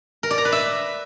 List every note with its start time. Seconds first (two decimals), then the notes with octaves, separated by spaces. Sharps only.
0.23 A#4
0.31 D5
0.38 A#5
0.45 B4
0.52 E5